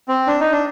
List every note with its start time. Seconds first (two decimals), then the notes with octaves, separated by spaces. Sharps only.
0.08 C4
0.27 D4
0.40 D#4
0.52 D4